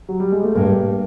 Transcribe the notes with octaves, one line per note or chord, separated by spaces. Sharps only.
F#3
G3
G#3
A3
G2 A#3